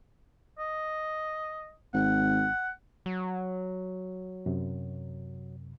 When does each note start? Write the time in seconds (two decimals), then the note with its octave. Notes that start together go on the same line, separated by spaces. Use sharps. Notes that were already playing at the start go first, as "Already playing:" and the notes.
0.58 D#5
1.94 G#1 F#5
3.06 F#3
4.46 F#2 C3